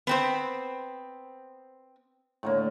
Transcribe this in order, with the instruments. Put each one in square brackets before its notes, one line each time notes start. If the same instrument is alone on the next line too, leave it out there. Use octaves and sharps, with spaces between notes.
[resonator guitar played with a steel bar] B3 C4 C5
[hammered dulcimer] A2 D3 A#3